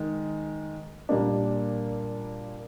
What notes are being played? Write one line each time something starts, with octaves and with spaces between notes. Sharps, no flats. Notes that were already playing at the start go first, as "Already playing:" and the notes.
Already playing: D#3 G#3
A#2 G3 A#3 D4